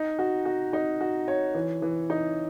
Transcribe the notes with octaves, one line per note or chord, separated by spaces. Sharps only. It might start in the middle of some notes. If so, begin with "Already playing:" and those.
Already playing: D#4
F#4
F#4
D#4
F#4
C#5
E3
E3
D#4